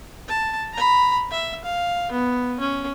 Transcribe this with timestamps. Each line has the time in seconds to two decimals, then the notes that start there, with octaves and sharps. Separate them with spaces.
0.28 A5
0.73 A#5 B5
1.31 E5
1.64 F5
2.11 B3
2.60 C#4